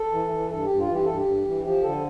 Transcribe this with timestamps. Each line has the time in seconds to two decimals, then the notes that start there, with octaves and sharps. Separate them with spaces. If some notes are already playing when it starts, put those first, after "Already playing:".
Already playing: A4
0.12 E3
0.32 E3
0.50 G2 A4
0.64 G2 G4
0.79 F4
0.88 E3
0.93 G4
1.05 G2 A4
1.17 G4
1.25 G2
1.45 E3
1.63 F3 G4
1.83 D3 A4